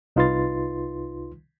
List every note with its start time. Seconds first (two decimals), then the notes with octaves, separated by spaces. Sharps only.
0.16 C2 D#4 F4 B4 C6 A6